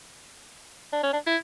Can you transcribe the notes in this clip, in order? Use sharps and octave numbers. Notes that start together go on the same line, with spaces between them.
D4
C#4
D4
E4